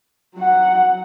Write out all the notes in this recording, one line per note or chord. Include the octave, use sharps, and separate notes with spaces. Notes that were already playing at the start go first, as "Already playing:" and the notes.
F#3 F#5